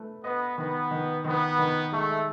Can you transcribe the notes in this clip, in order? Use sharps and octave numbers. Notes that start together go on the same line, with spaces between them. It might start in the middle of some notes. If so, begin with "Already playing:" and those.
Already playing: A3 B4
B3 D#5
D#3 B3
D#3
D#3 B3
D#3
G#3 A3